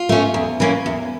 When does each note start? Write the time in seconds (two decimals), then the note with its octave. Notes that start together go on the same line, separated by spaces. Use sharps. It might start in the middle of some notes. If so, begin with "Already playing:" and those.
Already playing: F4
0.09 A3 C#4
0.34 E2
0.60 E3 A#3 C#4
0.86 E2